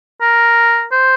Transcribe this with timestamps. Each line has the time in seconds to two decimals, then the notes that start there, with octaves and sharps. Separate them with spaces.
0.21 A#4
0.92 C5